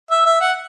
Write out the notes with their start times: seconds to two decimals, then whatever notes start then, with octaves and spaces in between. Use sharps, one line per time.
0.11 E5
0.26 E5
0.41 F#5